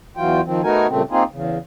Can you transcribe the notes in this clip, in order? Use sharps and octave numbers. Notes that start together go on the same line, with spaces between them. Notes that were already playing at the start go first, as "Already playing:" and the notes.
E2 E3 F#3 F4 G5
D#3 F3 C4
A3 B3 D#4 F#4 A#4 G#5
G2 A#2 C#3 A3 C4
A#3 C4 D#4 F4 G#4
E2 C#3